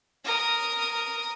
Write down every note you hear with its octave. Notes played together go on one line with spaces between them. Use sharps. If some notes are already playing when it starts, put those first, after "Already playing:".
A#4 D#6